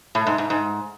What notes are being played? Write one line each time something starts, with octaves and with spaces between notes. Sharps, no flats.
A2
G#2
G#2
G#2